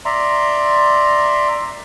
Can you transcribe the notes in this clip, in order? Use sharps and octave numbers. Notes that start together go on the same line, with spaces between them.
D5 E5 A#5 C6